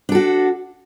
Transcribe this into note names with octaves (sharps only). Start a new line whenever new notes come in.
D4 F#4 A4